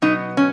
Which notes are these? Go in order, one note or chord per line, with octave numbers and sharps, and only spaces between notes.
B2 F#3 B3 D#4
C#4